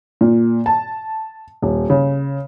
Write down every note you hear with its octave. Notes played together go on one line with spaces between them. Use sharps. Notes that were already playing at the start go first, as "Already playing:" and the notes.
A#2
A5
D#1
C#3